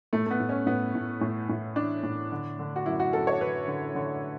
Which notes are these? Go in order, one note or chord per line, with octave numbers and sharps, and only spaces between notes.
A2 A3
A3
B3
A2
C#4
A2 B3
A2
A2
A2
E3 D4
A2
D3
D3
F#4
F#2 E4
F#4
F#2 A4
C#5
D3 B4
D3
D3